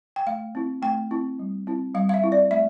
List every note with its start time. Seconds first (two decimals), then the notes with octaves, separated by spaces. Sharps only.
0.16 G5
0.27 A3 F5
0.55 C4 E4
0.82 A3 G5
1.11 C4 E4
1.39 G3
1.67 C4 E4
1.94 G3 F5
2.09 F5
2.14 E5
2.23 C4 E4
2.32 D5
2.51 A3 E5